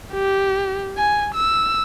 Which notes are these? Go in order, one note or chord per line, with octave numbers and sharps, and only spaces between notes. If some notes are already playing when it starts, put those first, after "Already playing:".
G4
G#5
E6